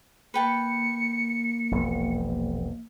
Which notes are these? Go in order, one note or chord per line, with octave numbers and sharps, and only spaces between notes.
A#3 B4 G5 A5 C#7
E1 A#1